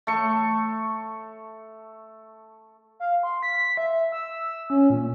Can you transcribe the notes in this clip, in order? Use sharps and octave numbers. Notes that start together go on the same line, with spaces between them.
A3 C#6
F5
C6
B6
E5
E6
C#4
A#2